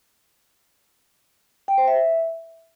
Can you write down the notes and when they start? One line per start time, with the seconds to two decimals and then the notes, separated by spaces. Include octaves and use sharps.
1.68 G5
1.78 C5
1.87 E5